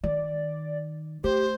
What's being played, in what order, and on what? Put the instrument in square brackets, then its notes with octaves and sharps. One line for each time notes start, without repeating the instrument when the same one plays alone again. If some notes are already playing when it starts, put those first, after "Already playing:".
[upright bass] D#3 [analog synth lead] D5
[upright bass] A3 [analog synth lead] G4 [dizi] C5